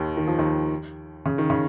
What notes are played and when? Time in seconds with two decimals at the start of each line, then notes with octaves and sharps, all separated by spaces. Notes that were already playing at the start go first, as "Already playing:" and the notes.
Already playing: D#2 D#3
0.17 D#3
0.27 F3
0.38 D#2 D#3
1.26 C#3
1.38 D#3
1.50 C#3